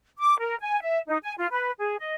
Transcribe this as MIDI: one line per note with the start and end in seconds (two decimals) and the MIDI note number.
0.18 0.35 86
0.39 0.56 70
0.60 0.79 80
0.82 0.99 76
1.07 1.18 63
1.22 1.33 80
1.37 1.47 65
1.50 1.71 71
1.78 1.95 68
1.99 2.15 75